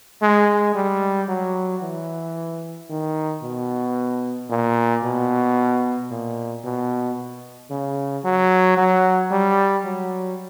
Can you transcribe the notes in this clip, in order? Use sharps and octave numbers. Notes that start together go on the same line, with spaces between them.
G#3
G3
F#3
E3
D#3
B2
A#2
B2
A#2
B2
C#3
F#3
F#3
G3
F#3